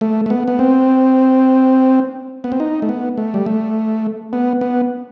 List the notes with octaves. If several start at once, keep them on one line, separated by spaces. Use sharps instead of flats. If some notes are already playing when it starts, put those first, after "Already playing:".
A3
A3
B3
B3
C4
B3
C4
D#4
A3
B3
A3
G3
A3
B3
B3